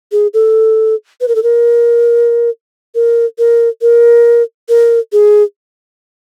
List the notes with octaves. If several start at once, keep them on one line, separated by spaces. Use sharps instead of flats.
G#4
A4
B4
A#4
A4
A#4
A#4
A#4
A#4
A#4
G#4